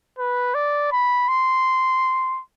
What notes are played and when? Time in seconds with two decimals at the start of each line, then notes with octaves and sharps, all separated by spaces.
0.19 B4
0.55 D5
0.92 B5
1.28 C6